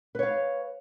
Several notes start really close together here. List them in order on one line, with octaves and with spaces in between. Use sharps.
B4 C#5 F5